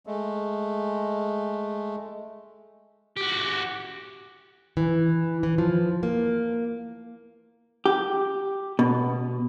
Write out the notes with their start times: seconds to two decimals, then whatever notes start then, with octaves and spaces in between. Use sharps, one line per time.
0.06 G#3 A3
3.17 F#4 G4
4.77 E3
5.43 E3
5.58 F3
6.03 A#3
7.86 G4
8.79 B2